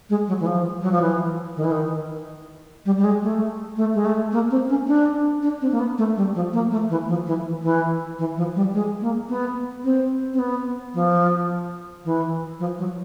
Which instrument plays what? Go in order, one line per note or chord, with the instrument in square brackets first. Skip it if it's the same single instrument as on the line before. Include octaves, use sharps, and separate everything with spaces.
[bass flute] G#3
F#3
E3
F3
F#3
F3
E3
D#3
E3
D#3
G3
G3
G#3
A3
A3
G#3
A3
A#3
C4
C#4
D4
D4
C4
A#3
B3
A3
G3
F3
A#3
A3
E3
F3
E3
E3
E3
F3
G3
G#3
A#3
B3
C4
C4
B3
F3
E3
F3
F#3